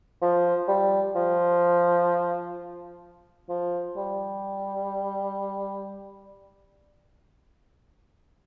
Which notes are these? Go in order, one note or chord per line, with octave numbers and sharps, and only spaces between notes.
F3
G3
F3
F3
G3